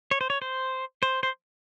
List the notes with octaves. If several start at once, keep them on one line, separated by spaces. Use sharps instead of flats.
C#5
C5
C#5
C5
C5
C5